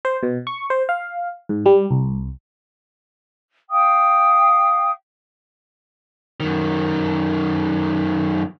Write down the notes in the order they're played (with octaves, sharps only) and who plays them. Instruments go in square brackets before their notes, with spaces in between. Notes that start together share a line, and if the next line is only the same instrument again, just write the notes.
[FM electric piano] C5
B2
C#6
C5
F5
G#2
G3
C2
[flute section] F5 G5 D#6
[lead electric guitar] F#2 D#3